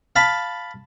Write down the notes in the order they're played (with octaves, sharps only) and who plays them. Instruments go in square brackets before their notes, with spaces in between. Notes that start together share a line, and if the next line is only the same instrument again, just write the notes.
[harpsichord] F5 A5 B5